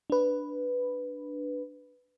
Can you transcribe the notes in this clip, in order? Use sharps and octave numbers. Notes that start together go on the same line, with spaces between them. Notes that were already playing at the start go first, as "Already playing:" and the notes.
D4 B4